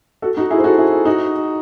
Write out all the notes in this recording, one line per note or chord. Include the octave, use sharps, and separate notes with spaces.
F#4 A4
D#4 F#4
E4 G#4
C5
F#4 A4
E4 G#4
D#4 F#4